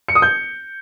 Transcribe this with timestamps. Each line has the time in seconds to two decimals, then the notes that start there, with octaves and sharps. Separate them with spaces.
0.08 C#7
0.15 D#6
0.22 G6